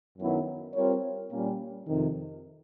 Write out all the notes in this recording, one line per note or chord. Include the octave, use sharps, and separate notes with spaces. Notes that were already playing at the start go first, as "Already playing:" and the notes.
F#2 D#3 F#3 B3 E4
G3 C4 F4 A#4 C#5
A#2 G3 A#3 C#4
F2 C3 D#3